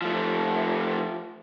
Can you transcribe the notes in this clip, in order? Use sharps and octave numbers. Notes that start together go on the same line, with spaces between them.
F3 A3